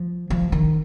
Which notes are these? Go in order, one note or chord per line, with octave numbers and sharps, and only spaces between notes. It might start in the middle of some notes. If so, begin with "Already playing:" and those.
Already playing: F3
F3
D#3